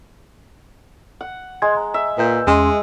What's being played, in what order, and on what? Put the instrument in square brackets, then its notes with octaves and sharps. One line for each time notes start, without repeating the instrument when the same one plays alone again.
[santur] F#5
[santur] G#3 [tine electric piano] C6 G#6
[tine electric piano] A#5
[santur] E5
[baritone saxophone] A#2 [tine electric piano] B4 G6
[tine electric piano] E2 C#4 C6 [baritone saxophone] G#3